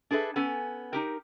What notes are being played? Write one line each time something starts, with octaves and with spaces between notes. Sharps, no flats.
D4 G#4 A4 B4 E5
B3 C#4 A4 G#5
D#4 G4 A#4